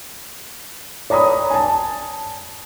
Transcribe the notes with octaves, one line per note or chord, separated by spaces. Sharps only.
C#5 D5 A#5 B5 D#6
G#5 A5